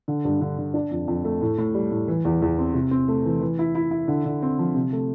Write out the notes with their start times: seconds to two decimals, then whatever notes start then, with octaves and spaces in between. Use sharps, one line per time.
0.08 D3
0.25 G2
0.41 D3
0.58 D3
0.74 D4
0.91 F2
1.08 F2
1.25 A3
1.41 A2
1.58 A2
1.75 G3
1.92 A2
2.08 E3
2.25 E2
2.42 E2
2.59 C4
2.74 C3
2.91 C4
3.08 A3
3.25 E3
3.41 E3
3.59 E4
3.75 E4
3.91 E4
4.08 D3
4.25 D3
4.42 C4
4.59 F3
4.75 C3
4.92 A3